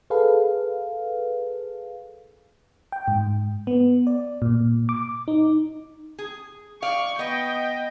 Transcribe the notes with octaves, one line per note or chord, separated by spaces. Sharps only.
G#4 A4 B4 F5
G5
G#2
B3
D5
A#2
D6
D#4
G#4
D5 F5 C#6
B3 D#5 G5